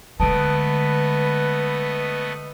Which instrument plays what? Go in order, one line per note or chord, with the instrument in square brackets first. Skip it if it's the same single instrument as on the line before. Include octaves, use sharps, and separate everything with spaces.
[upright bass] D3 G#3 [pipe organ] A3 B3 D#5 [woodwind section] B4 [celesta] A5 D7